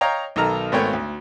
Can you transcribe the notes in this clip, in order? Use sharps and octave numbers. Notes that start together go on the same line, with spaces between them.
C#5 D#5 F5 G5 A#5
B1 D#3 D#4 A4 A#5 F6
G#1 A3 B3 A#4 C#5 G5
D2